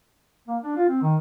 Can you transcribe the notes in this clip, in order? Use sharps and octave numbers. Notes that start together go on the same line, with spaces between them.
A#3
D4
F4
C4
D#3